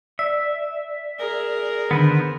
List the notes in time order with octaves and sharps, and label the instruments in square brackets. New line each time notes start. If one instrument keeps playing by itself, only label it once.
[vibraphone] D5 [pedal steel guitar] E5
[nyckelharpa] G#4 A#4
[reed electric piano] D3 D#3 [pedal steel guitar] B3 B4 C5